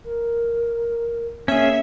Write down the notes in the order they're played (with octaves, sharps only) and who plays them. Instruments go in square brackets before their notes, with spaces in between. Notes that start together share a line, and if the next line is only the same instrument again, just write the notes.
[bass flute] A#4
[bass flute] A#3 [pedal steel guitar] C#4 G#4 [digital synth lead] E5